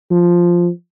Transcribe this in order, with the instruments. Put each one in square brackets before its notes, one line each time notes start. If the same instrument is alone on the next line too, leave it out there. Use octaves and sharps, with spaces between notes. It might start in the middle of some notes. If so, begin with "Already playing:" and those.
[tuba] F3